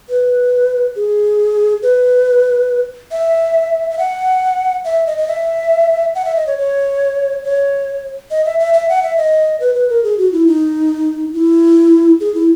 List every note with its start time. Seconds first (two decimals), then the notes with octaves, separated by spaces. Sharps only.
0.09 B4
0.96 G#4
1.83 B4
3.11 E5
3.90 E5
3.98 F#5
4.85 E5
5.07 D#5
5.18 D#5
5.28 E5
6.15 F#5
6.25 E5
6.36 D#5
6.47 C#5
6.58 C#5
7.44 C#5
8.31 D#5
8.45 E5
8.59 E5
8.74 E5
8.89 F#5
9.03 E5
9.17 D#5
9.60 B4
9.75 B4
9.89 A#4
10.04 G#4
10.18 F#4
10.32 E4
10.47 D#4
11.34 E4
12.20 G#4
12.34 E4